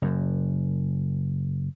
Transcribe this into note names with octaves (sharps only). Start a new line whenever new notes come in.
F#1 F#2